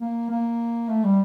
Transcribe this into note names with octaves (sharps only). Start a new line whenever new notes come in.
A#3
A#3
A3
G3